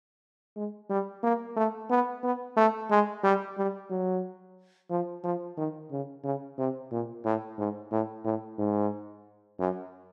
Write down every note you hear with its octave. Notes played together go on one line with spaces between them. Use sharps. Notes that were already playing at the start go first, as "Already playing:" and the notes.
G#3
G3
A#3
A3
B3
B3
A3
G#3
G3
G3
F#3
F3
F3
D#3
C#3
C#3
C3
A#2
A2
G#2
A2
A2
G#2
F#2